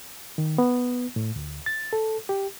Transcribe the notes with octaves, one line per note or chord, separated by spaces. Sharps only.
D#3
B3
A2
D2
A6
A4
G4